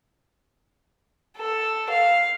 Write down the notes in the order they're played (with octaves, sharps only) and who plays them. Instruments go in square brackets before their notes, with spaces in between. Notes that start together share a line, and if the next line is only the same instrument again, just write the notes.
[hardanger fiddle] A4
F5